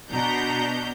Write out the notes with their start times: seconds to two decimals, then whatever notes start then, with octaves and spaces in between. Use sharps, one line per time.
0.10 B2 D4 A#5 G6